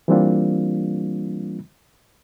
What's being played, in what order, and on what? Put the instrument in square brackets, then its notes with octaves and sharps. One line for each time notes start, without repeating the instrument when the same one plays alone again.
[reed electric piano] E3 G3 A#3 C4 D4 F4